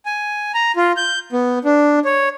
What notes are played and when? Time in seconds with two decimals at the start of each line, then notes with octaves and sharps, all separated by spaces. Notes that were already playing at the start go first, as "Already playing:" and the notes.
0.06 G#5
0.54 A#5
0.76 F4
0.97 G6
1.32 B3
1.65 D4
2.05 C#5